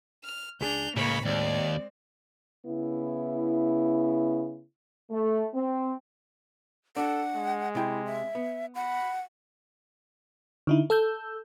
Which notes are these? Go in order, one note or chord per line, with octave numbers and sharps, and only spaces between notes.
F6
C#2 D4 G#4 G6 F7
C#2 A2 C#3 A#3 C#5 B5
D#2 G#3 C4 D5
C#3 B3 E4
A3
C4
D4 A4 F#5
G#3
C3 E4 G5
E5
B3
F#5 B5
D3 D#4 E4
A4 E6 G6